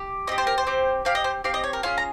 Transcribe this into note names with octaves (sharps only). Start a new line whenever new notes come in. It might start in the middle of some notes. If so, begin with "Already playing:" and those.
Already playing: G4
C4 G4 D#5
C5
A#4
C5
C4 G4
C4 G4 F5
D#5
C5
C4 G4 F5
D#5
C#5
A#4
C#4 F4 G#4 F5
A#5